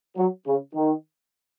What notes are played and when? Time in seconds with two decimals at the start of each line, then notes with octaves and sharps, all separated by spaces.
0.17 F#3
0.46 C#3
0.75 D#3